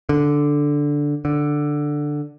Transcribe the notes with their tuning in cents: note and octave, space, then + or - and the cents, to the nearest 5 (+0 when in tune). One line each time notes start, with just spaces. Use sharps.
D3 -5
D3 +5